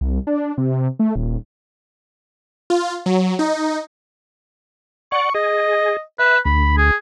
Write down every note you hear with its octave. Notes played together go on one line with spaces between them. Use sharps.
C2
D4
C3
A3
D#1
F4
F#3
D#4
D5 F#5 C#6
G#4 D#5
B4 E5
D2 B5
G#4